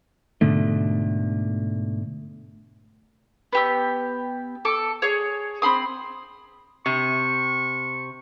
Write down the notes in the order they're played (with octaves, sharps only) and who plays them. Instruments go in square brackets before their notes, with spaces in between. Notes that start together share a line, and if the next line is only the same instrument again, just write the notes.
[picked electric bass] G#2 B2 D3 A3
[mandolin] B3 G4 E6
A4 D6
G#4 C#5
C4 B5 C6 D#6
[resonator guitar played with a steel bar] C3 [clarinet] C#6